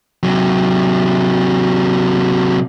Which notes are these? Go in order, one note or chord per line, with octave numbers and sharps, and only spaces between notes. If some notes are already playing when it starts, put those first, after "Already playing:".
C3 F#3